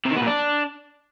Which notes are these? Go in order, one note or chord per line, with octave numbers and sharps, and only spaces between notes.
C3
D#3
B3
A#2
D4